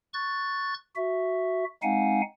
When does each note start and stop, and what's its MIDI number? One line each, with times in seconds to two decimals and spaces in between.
0.14 0.74 85
0.14 0.74 90
0.14 0.74 93
0.96 1.64 66
0.96 1.64 76
1.83 2.21 56
1.83 2.21 60
1.83 2.21 63
1.83 2.21 77
1.83 2.21 78
1.83 2.21 80